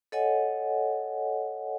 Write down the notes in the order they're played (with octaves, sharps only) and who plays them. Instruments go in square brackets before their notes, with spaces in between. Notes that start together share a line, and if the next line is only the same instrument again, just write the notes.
[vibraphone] A4 C#5 D#5 F#5 G#5